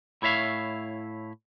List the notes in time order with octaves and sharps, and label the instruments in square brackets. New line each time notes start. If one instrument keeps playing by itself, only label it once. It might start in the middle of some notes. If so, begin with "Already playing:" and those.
[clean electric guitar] A2 E4 C#5 E5 F5